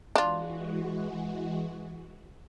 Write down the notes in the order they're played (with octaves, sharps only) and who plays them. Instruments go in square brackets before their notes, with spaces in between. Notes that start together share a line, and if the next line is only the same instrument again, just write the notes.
[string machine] E3 G#3 F#4 [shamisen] D4 F4